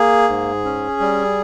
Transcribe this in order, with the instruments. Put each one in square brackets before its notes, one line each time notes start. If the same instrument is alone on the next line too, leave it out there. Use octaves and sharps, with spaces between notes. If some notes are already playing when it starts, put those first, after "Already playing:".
Already playing: [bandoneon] A#3 G#4
G#2
C#4
G3